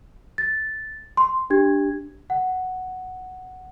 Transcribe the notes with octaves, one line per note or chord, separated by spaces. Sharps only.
A6
C6
D4 G4 G#6
F#5